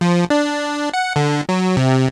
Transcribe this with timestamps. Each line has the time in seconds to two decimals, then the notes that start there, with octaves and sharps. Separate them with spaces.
0.01 F3
0.30 D4
0.94 F#5
1.16 D3
1.49 F#3
1.77 C3